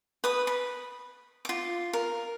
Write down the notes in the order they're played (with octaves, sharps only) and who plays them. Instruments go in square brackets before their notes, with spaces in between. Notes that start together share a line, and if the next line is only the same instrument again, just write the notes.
[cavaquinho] B4 D#6
B5
F4 D6
A#4